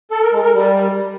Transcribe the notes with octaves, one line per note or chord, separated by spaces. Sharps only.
A4
A#4
G#3
A#4
G3